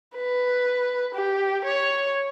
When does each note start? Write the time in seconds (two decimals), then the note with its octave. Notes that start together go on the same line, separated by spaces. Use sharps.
0.15 B4
1.15 G4
1.65 C#5